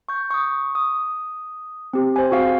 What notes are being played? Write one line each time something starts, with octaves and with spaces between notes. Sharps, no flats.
C#6 G6
C#6 D#6
D#6
C4 G4
C5 G#5
C4 F#4 G#4 F5